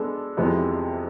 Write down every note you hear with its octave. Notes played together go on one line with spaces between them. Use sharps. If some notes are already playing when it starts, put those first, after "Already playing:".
Already playing: G#3 B3 D4 A4
F2 C3 E3 G#3 B3